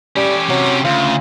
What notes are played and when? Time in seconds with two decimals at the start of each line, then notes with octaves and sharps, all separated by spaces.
0.16 G3 C#4 G4
0.50 C3 F#3
0.85 D2 C#3 F4